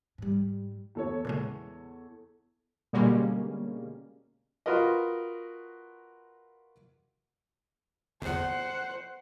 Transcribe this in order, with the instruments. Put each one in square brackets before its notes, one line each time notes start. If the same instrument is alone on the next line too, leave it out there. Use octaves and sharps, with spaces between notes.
[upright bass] G#2 G3
[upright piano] E2 A4 C#5
[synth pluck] A#2 C#3 G#3
[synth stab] B2 D3 G3 G#3 A#3 C#4
[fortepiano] F4 F#4 A#4 B4 D#5
[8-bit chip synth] G1 E2 [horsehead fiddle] C5 F#5